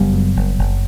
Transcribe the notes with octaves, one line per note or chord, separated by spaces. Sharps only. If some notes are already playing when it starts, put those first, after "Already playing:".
Already playing: F#1 G3 B3
F#2
F#1
F#1